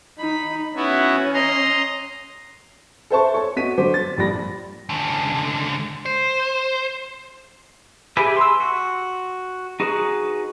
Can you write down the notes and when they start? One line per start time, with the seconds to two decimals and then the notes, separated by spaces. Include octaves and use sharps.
0.19 D#4 B5
0.76 B3 C#4 E4 F#4
1.34 D#5 A#5 C6
3.10 A4 B4 C5 E5 A5 C#6
3.34 A4 C#5 C#6
3.56 B3 F#4 D#5 B6 D#7
3.78 D3 F#3 C5 D6
3.94 A6
4.18 A#1 G2 G4 D5 B5 A#6
4.89 C#2 D3
6.06 C5
8.17 G4 G#4 B4 E5
8.37 C6 E6
8.60 F#4
9.80 D#4 F#4 G#4 B4